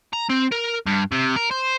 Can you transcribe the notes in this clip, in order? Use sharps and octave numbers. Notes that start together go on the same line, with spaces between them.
A#5
C4
A#4
G2
C3
A#4
C5